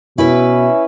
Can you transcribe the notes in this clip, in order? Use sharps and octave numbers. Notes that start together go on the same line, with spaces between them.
B2 C#4 E4 B4 E5